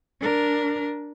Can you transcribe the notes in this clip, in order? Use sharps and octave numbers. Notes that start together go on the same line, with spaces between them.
D4 A#4